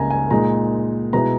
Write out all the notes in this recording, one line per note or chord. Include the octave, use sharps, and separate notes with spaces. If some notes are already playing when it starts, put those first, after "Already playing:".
Already playing: C#2 C#3 G3 A#3 D#4 G#5 A#5
G#5
A#2 G#3 D#4 A#5
B2 G#3 B3 E4 A#5